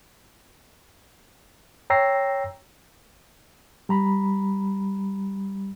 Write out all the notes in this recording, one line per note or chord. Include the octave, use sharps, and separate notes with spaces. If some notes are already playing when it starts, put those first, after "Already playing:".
C#5 G5 A#5 E6 A#6 C7
G3 A#5 B5